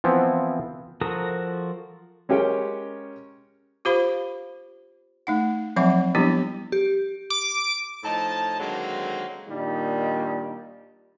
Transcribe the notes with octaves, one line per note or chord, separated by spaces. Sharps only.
E3 F3 B3 C4 E4
F3 F#4 A4 A#4 D#6
G#3 C#4 G4 A#4 C#5 G5
F4 G4 C5 F5 B5
A3 D#4 F#5
F3 F#3 C4 E5 F#5 B5
F3 G3 B3 D4 E4 G4
G4
D6
A2 F3 D#4 A5
D3 D#3 F#3 G#3 A#3 C4
A#2 D#3 G3 D4 D#4